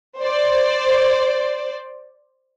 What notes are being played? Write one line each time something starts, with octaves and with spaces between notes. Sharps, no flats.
C5 D5